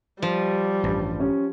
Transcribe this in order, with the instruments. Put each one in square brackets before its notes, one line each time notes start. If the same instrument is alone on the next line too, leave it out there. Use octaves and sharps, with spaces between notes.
[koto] F3 [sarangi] G3
[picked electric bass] A1 G2
[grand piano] C#4 G4